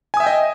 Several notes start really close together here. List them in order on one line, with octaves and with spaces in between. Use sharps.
G#5 D#6 E5 G5 D#5